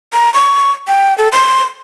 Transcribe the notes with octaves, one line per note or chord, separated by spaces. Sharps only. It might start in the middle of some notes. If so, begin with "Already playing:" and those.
A#5
C#6
G5
A4
C6